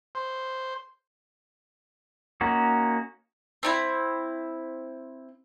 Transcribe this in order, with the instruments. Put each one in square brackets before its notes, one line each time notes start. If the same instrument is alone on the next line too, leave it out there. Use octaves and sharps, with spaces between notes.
[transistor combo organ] C5
[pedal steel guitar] A#3 C#4 D#4 F#4
[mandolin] C4 D#4 E4